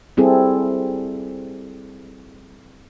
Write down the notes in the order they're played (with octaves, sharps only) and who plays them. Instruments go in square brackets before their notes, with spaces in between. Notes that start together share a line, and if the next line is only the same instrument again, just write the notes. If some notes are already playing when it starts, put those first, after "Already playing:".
[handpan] G3 C4 E4 G#4 A4